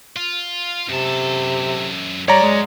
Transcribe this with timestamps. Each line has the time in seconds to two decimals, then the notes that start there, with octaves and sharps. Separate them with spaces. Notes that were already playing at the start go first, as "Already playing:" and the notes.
0.16 F4
0.89 F#2 C3 A4
2.28 F#2 G3 C#5 D5 A#5
2.43 G#3